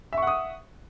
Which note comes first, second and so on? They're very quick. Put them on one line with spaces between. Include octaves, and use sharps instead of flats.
E5 C#6 F#5 D#6